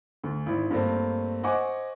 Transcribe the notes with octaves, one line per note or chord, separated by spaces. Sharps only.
D2
G#1 E4
G2 A3 A#3 C4
C5 D#5 F#5 G#5 C#6 D6